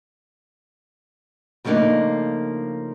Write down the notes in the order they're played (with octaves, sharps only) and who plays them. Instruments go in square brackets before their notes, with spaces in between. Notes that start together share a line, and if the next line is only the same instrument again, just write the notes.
[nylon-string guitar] C#3 F3 A3 A#3 D4 D#4